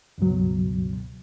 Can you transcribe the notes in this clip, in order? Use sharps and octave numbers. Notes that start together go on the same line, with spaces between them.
C#2 G2 B2 F#3